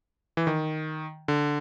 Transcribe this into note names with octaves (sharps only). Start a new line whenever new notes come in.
E3
D#3
D3